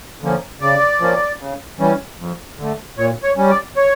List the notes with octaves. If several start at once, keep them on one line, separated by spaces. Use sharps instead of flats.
D3 F3 A#3 C#4
C#3 D5
F3 A#3 C#4
C#3
E3 G3 C#4
F2
D3 A3
A#2 C#5
C#5
G3 C#4
D5
C#5